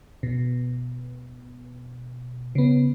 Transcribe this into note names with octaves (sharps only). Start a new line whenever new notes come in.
B2
C#3 B3